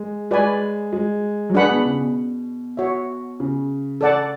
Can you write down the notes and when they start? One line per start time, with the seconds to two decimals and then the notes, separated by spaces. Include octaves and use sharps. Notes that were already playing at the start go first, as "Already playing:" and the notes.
Already playing: G#3
0.31 G#3 B4 D5 G#5 B5
0.93 G#3
1.50 F#3
1.54 G#3 D4 G#4 B4 F#5 B5
1.70 B2
1.85 C#3
2.00 B2
2.77 F#4 C#5 E5
3.40 C#3
4.01 A4 D5 F#5 A5